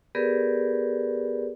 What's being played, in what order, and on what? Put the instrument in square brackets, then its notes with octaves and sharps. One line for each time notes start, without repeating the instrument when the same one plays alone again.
[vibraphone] B3 G4 G#4 A#4 B4 D5